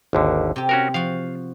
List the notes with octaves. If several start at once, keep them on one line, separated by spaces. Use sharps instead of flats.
G#1 D#2 D3
C3 G4
C#4 F#4 A#4
F3 F#4 F5